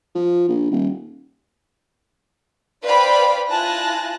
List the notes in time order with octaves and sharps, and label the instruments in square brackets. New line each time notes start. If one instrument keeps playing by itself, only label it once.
[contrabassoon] F3
A#1
D#1
[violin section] B4 C5 D5 F5 G5 B5
E4 F4 G#5 A5 F#6 A#6